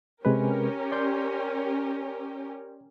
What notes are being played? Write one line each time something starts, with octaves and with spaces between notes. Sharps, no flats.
C3 G#3 C#4 G4 A#4 B4
D5 C6 G6